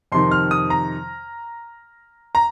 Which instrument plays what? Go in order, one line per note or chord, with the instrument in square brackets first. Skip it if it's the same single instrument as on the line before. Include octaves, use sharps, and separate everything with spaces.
[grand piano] F2 C3 D#3 C6
F6
D#6
A#5
A#5